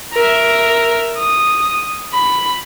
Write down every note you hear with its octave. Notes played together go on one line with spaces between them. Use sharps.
A#4 E5
D#6
B5